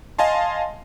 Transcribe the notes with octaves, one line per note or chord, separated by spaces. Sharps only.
D#5 F5 G#5 A5 C6